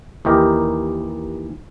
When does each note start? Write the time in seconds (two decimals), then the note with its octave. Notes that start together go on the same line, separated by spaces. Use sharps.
0.25 D#2 E3 D#4 G4 A#4